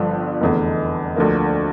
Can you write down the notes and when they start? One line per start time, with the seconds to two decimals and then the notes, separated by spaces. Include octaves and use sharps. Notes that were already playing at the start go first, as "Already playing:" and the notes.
Already playing: G1 G2 D3 F3
0.41 F1 E2 D3
1.16 D2 D3 F3 A#3